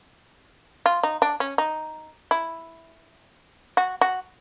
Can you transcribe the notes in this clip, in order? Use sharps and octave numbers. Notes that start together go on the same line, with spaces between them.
F4
D#4
D4
C#4
D#4
E4
F#4
F#4